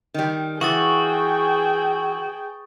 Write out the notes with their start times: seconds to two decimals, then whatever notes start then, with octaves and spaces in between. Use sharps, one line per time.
0.14 D#3 G3
0.61 E3 F#4 G#4 G5 C#6 D#6 A6